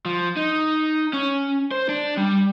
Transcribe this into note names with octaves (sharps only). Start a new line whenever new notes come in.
F3
D#4
C#4
C5
D4
G3